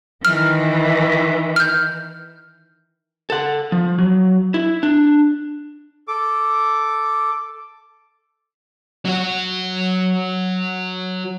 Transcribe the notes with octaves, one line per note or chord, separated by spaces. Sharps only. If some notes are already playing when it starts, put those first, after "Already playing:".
D#3 E3 F6
F6 G6
A4 F#5
F3
F#3
E4
D4
A4 D6
F#3 F#4